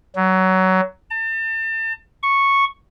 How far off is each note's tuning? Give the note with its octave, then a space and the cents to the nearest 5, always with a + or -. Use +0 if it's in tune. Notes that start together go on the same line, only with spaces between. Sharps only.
F#3 +20
A5 +35
C#6 -5